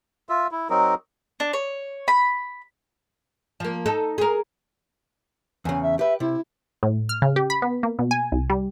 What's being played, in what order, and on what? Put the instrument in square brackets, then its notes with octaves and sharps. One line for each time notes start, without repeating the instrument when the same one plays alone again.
[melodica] F4 E5
E4
F#3 C4 D#4 A#4
[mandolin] D4
C#5
B5
[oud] F3 A#3
D#4 A4
G#4 A#4
[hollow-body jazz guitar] E2 C#3 [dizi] G#5
[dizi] E5
[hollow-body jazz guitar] G4 B4 [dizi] E5
[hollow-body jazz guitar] C3 [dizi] E4
[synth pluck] A2
F6
C#3
G4
B5
B3
A#3
B2
G#5
C2
G3